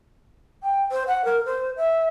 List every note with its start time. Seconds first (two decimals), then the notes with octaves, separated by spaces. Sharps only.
0.64 G5
0.91 C5
1.07 F#5
1.25 A#4
1.46 C5
1.77 E5